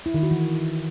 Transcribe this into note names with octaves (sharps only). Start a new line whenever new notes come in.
E4
D#3
F#4
E3